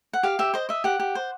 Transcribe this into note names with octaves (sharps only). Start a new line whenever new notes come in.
F#5
G4 F5
G4 E5
C5 D#5
D#5 E5
G4 F#5
G4
C5